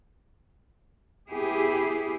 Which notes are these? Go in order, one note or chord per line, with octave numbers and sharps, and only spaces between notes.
B3 E4 G4 G#4